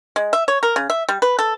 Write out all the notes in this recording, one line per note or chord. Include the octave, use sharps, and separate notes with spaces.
G#3
E5
C#5
A#4
C#3
E5
G3
B4
A4